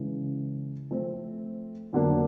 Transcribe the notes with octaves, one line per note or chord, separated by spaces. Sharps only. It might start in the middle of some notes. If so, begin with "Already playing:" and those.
Already playing: C#3 E3 G#3
F3 A3 C4
F2 D3 F#3 A#3 D4